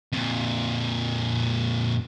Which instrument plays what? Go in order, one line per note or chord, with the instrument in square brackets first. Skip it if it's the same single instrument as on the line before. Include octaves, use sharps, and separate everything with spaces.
[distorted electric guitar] F2 A#2